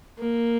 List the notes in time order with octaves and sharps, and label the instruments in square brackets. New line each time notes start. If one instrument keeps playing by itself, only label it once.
[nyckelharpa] A#3